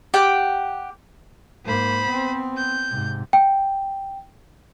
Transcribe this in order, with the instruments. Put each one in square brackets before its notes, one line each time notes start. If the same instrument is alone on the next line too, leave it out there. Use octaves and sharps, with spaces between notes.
[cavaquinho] G4 F#5 G5 D6
[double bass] G#2 A#3 [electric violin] C5 B5
[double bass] B3 C4
[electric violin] G6
[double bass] G#2 C3
[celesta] G5